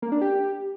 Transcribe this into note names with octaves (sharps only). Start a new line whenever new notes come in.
A#3
D4
G4